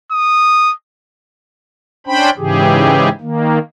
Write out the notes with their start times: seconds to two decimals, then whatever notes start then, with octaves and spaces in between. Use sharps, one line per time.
0.12 D#6
2.07 C#4 D4 C5 G5 B5
2.37 G#2 C#3 E3 G4 G#4
3.21 D#3 A#3